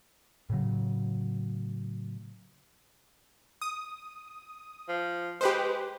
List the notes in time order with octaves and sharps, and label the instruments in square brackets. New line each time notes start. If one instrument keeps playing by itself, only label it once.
[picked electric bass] A2 C#3 F#3
[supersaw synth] D#6
[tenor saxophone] F3
[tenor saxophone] G#3 [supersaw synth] G4 B4 C5